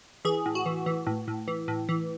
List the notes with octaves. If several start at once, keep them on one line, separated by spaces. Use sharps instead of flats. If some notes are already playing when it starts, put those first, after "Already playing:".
E3 G#4
A2
F#4
E3
E3
A2
A2
E3
A2
E3